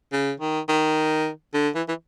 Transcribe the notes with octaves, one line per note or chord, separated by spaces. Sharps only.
C#3
D#3
D#3
D3
E3
E3